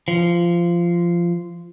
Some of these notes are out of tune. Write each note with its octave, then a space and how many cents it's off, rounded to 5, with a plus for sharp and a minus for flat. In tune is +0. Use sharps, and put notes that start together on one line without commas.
F3 -15